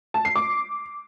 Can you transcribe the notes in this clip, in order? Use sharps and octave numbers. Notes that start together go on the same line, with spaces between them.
A5
C7
D6